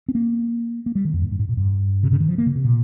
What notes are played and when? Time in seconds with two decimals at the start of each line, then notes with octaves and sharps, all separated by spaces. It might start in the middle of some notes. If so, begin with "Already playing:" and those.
0.09 C4
0.15 A#3
0.86 A#3
0.95 G3
1.05 D#3
1.13 F2
1.22 G#2
1.31 G2
1.39 G#2
1.49 A#2
1.57 G2
2.03 C3
2.12 C#3
2.20 D#3
2.29 F3
2.38 A#3
2.46 C#3
2.55 C3
2.64 A#2